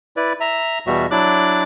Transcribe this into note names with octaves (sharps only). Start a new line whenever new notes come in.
E4 B4 D5
E5 A#5
E2 B2 G3 F#4 E5
F#3 D4 E4 D5 D6 F#6